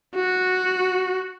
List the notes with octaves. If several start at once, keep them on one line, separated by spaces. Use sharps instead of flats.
F#4